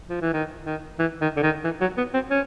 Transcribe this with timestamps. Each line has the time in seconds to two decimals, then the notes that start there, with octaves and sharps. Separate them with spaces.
0.09 F3
0.21 E3
0.33 D#3
0.66 D#3
0.99 E3
1.21 D#3
1.37 D3
1.43 D#3
1.64 E3
1.81 F#3
1.97 B3
2.14 C4
2.30 C#4